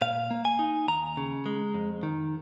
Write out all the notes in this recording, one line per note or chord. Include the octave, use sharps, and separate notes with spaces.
A#2 F5
A#3
G#5
D#4
D#2 A#5
C#3
G#3
F2
D#3